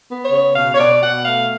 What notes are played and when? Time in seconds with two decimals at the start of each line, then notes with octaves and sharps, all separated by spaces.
0.09 B3
0.24 C#5
0.32 C#3
0.55 B2 F5
0.74 C#5
0.79 B2 D5
1.02 B2 F#5
1.25 A3 F5